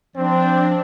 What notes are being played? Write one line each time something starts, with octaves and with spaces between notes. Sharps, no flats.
F3 C4 D4